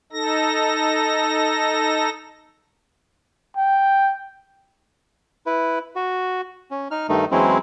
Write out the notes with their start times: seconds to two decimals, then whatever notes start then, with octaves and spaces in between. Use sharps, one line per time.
0.12 D#4 A4 A#6
3.57 G5
5.46 E4 B4
5.96 F#4
6.71 C#4
6.91 D#4 F6
7.09 G2 D#3 A3 D#4
7.31 E2 F#3 G#3 C4 C#4 E4